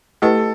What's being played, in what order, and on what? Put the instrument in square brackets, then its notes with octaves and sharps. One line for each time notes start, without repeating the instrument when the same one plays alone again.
[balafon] A3 E4 G4 B4 D#5 [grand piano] A4